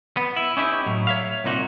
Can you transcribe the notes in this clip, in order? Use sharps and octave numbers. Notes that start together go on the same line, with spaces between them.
B3
E4
C#4 D#4 E4 G4
A2 F#3
C#5 E5 F5
C2 A#2 D#4 F#4